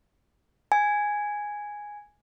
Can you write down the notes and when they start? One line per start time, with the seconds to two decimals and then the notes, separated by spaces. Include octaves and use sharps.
0.72 G#5